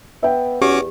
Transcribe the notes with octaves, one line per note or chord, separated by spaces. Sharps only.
B3 E5 G5
E2 C#4 F#4 G4 D6